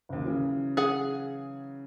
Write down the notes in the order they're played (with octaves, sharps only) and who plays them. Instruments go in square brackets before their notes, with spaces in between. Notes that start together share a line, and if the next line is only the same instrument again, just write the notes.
[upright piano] F#1 D#2
C#3 E3 F#3
[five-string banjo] G#4 F#5